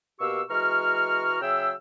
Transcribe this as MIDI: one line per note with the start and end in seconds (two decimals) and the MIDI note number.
0.20 0.42 47
0.20 0.42 58
0.20 0.42 67
0.20 0.42 77
0.20 0.42 85
0.20 0.42 88
0.50 1.37 52
0.50 1.37 56
0.50 1.37 66
0.50 1.37 82
0.50 1.37 85
0.50 1.37 89
1.42 1.73 49
1.42 1.73 54
1.42 1.73 68
1.42 1.73 76
1.42 1.73 79
1.42 1.73 88